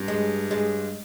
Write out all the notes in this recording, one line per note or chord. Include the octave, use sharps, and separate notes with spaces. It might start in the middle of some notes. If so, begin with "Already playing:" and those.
Already playing: G2
G#3
G#3